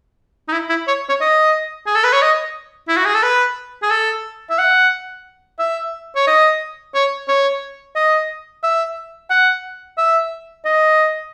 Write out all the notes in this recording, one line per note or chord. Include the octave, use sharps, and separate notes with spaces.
D#4
E4
E4
C#5
C#5
D#5
G#4
A4
B4
C#5
D#5
E4
F#4
G#4
A4
B4
G#4
A4
E5
F#5
E5
C#5
D#5
C#5
C#5
D#5
E5
F#5
E5
D#5